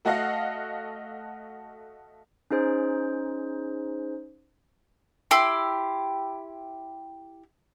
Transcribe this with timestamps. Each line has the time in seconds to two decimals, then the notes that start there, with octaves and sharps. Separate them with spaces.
0.05 A3 F#4 A4 D#5 F5 F#5
2.51 C#4 D#4 G#4 C5
5.31 E4 G4 C6